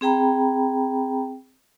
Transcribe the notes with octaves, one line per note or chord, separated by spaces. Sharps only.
C4 G#4 G5 A#5 B5